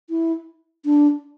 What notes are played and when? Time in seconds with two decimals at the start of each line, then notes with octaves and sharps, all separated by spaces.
0.10 E4
0.85 D4